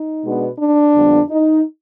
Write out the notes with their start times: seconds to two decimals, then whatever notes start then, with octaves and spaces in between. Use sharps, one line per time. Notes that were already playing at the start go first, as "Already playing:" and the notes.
Already playing: D#4
0.23 B2 G#3 B3 D4
0.59 D4
0.95 F2 D3 G3 B3
1.30 D#4